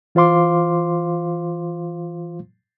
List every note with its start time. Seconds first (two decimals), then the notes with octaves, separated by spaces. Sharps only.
0.15 E3 F4 C5 F5 C6 D6